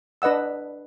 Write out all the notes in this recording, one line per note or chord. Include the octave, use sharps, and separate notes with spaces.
D4 B4 D#5 F#5 E6